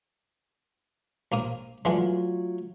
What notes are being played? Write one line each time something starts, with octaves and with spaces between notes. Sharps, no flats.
A#1 A#3 D#6
D3 E3 F#3 G#3 A3 F4